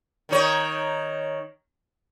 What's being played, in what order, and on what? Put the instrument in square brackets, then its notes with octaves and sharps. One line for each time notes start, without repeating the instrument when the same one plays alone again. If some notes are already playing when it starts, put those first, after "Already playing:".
[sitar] D#3 D#4 C#5